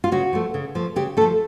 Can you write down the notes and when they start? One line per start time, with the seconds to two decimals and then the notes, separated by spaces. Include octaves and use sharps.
0.04 F4
0.12 C#3 F#4
0.33 F3 A3
0.54 C#3
0.75 F3 A3
0.96 C#3 G4
1.17 A3 A4
1.21 F3